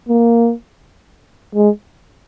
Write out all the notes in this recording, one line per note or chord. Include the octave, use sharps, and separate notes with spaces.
A#3
G#3